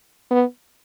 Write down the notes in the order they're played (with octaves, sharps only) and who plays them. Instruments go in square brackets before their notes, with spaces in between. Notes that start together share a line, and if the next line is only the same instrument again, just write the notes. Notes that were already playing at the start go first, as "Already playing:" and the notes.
[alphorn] B3